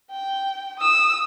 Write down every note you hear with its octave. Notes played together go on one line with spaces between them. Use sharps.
G5
D#6 E6